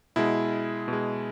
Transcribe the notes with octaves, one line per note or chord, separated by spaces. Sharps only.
B2 G#3 E4
B2
G#3